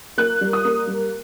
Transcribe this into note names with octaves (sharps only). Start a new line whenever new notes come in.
A#3 F#6
G3
D#6
A#3
G3